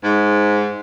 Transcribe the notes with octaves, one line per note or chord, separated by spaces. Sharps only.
G#2